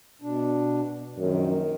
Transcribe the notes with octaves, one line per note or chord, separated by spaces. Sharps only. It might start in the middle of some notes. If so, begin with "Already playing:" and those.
B2 D4
A#1 F#2 D#3